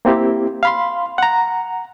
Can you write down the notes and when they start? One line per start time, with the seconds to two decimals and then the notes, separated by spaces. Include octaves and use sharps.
0.05 A#3 C4 E4 G4
0.63 F5 B5 C6
1.18 F#5 A#5